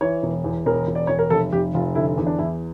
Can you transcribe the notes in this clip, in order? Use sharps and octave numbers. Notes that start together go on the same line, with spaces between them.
E3 C#5
E1
E2
E1 A#4
E1
D5
E1 C#5
A#4
F1 A4
F1 G4
F1 F4
D3 E4
E2
D4
E2 E4